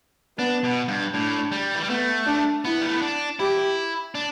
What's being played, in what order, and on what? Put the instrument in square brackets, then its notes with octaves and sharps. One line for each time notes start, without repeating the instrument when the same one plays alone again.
[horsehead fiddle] B3 [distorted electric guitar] D4
[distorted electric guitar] B2
G2
[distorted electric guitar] A2 [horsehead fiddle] D4
[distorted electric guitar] G3
E3
G3
[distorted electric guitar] A3 [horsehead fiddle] B3
[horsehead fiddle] D4
[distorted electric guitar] B3 [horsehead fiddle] E4
[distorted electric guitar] G3
A3
B3
D4
[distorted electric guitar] E4 [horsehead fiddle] G4
[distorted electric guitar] D4